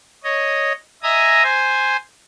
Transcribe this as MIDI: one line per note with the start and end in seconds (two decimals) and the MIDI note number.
0.24 0.73 73
0.24 0.73 75
1.03 1.43 75
1.03 1.43 76
1.03 1.43 80
1.03 1.43 82
1.03 1.43 87
1.43 1.96 72
1.43 1.96 80